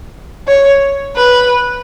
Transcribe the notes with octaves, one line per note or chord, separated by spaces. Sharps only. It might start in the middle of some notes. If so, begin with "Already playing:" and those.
C#5
B4